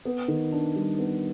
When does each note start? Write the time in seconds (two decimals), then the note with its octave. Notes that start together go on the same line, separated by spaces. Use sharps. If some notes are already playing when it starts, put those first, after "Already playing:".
0.05 B3
0.28 D#3
0.52 D4
0.76 G3
0.99 B3